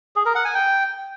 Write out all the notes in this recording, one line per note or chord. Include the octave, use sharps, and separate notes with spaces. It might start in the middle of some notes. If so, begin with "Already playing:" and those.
G#4
A#4
F#5
G#5
G5